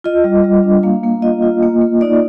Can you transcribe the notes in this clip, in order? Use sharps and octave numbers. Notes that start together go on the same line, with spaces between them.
F4 D#5
G3
G3
D4
A#3 F5
A#3
F4 D#5
F4
A#3
A#3
D#4 D5